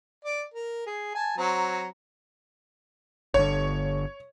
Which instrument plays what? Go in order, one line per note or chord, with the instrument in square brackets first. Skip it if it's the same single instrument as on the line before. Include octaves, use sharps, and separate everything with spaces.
[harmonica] D5
A#4
G#4
G#5 A5
F#3 C4 A#5
[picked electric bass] G1 D3 [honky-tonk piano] C#5